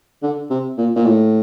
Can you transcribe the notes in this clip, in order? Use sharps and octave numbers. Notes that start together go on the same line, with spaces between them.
D3
C3
A#2
A#2
A2